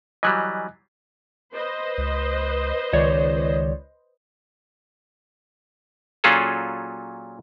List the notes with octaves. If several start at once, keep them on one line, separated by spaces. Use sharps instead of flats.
E3 F#3 G3 D#5 G#5 F#6
B4 C5 D#5
C#2
C#2 D#3 C#5 D5
A#2 F#3 C#4 F4 G#4 A4